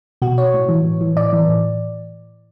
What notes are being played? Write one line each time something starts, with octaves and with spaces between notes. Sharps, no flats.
B2 F#4
C#5
A2
E3
A2
E3
A2 D5
E3
A2